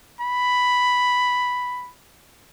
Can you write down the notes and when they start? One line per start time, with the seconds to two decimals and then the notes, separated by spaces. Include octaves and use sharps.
0.21 B5